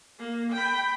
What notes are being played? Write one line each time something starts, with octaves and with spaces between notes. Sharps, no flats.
A#3
G5 B5